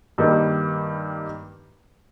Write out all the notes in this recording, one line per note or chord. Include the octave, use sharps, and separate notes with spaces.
G2 D#3 G3 A#3 D#4